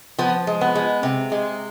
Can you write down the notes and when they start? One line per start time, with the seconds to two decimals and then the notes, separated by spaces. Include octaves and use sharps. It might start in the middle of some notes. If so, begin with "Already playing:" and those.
0.18 F3 B3
0.47 G#3
0.61 B3
0.75 G#3
1.03 C3
1.32 G#3